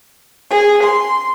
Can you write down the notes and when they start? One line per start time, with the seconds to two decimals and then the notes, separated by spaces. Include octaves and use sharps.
0.50 G#4
0.82 C6